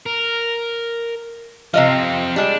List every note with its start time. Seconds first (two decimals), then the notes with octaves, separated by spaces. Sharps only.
0.06 A#4
1.74 C3 F3 C4 D#5 F5
2.36 G3 G#3 D4